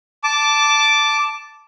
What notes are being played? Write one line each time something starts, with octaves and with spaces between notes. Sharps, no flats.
A5 D6